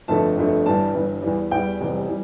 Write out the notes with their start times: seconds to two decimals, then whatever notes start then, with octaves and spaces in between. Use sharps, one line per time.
0.08 G1 F2 D3 A3 A5
0.37 G1 F2 D3 A3
0.66 G1 G2 E3 G3 A5
0.94 G1 G2 E3 G3
1.22 E2 E3 G3
1.51 E2 E3 G3 G5
1.80 F1 E2 E3 G3
2.09 E3 G3